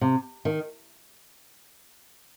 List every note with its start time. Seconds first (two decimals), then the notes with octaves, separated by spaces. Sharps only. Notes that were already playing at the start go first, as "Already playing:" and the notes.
0.01 C3
0.45 D#3